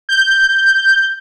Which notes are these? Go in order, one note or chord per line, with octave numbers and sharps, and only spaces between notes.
G6